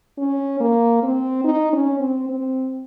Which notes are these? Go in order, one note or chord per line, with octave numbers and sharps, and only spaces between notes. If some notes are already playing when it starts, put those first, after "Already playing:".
C#4
A#3
C4
D#4
C#4
C4
C4